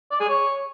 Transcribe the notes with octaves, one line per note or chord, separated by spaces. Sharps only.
D5
G#4
C#5